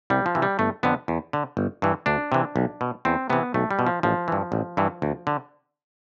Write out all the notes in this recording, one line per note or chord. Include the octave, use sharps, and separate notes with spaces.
C2 G3
F3
C3 E3
G3
G1 A3
F2 D3 B3
E2
D3
G1
G2 E3
D2 D4
C3 E3
B1
B2
E2 C4
C3 E3 B3
B1 A3
G3
B2
F3
A1 F3
G2 E3
A1
G2 E3
D2
D3